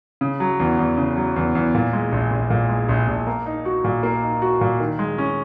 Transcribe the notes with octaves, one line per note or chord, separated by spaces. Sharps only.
C#3
F#3
E2
E2
C#3
F#3
E2
E2
A#2
G#3
A#1
A#1
A#2
G#3
A#1
A#1
A#3
D#4
F#4
A#2
A#3
D#4
F#4
A#2
D#3
G#3
C#4